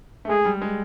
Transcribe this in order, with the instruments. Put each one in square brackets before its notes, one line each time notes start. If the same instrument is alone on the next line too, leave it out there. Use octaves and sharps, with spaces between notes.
[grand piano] A3
[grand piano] G#3 [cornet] G#4
[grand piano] G3
G#3